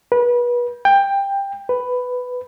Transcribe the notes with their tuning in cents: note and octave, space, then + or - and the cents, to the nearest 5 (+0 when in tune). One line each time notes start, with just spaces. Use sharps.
B4 -30
G5 +15
B4 +10